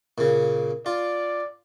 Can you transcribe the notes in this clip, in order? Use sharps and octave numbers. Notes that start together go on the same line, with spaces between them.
A#2 C#3
F4 D5